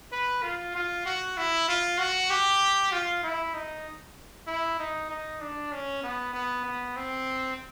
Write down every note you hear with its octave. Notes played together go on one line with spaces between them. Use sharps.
B4
F4
F4
F#4
E4
F4
F#4
G4
F4
E4
D#4
E4
D#4
D#4
D4
C#4
B3
B3
B3
C4